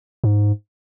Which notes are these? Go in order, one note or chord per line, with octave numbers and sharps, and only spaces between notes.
G#2